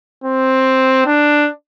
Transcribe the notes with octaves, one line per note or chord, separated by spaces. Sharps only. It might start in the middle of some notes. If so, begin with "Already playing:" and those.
C4
D4